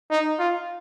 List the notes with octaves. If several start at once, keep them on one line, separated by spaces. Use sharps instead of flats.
D#4
F4